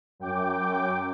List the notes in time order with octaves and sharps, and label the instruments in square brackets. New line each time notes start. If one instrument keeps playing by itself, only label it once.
[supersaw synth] F#2 G5 D6